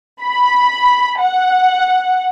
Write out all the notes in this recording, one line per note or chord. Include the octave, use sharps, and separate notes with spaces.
B5
F#5